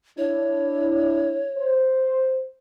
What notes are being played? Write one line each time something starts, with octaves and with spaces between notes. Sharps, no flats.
D4 E4 C#5
C5